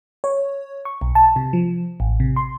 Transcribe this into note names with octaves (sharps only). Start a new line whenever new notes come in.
C#5
C#6
B1
A5
C3
F3
A1
C3
C6